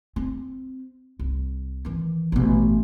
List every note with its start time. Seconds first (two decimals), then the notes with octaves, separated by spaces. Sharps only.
0.16 C4
1.19 C2
1.85 D#3 E3
2.32 A1 B2